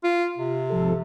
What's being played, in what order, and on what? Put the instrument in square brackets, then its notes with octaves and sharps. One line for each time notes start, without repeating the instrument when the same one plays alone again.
[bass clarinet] F4
C3
[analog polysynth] G#1 F3 A4